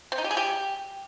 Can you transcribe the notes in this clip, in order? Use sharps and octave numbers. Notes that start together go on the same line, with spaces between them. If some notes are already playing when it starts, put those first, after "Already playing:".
C4
D#4
G4
G#4
G4